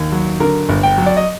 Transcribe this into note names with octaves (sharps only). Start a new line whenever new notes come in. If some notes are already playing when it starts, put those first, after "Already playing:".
Already playing: D#2
F#3
D3 A#4
G1
G5
F#3
D5
D#5